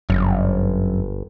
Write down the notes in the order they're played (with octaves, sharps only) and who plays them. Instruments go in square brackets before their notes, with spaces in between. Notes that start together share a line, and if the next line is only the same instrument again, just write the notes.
[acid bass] G1 [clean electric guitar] F#2